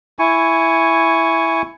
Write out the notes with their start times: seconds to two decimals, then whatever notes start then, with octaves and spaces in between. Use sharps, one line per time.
0.19 E4 G#5 C#6